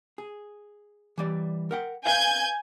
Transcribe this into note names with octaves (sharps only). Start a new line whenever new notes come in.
G#4
E3 G3 D5
A#4 F#5 G5
B4 E5 F5 G#5 G6 G#6